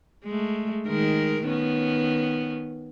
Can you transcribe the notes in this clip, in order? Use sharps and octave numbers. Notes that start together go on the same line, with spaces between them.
G#3 A3
D#3 G#3 A#4
D#3 B3 C#4